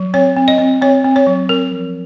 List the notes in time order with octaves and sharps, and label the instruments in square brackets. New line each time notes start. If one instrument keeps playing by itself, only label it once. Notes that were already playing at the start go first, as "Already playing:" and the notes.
Already playing: [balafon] F#3
C4 C#5
C4
D#5
C4
C4 C#5
C4
C#5
F#3
C4 A#4
F3